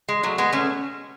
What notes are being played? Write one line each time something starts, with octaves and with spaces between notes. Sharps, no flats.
G#3
F#3 A3
G#3 B3
A3 C#4